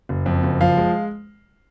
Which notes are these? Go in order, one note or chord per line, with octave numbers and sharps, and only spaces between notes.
F#1
F2
F#1
F3 F5
G#3